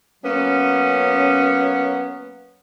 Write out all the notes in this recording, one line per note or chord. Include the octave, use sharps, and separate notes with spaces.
F#3 A#3 B3 C#4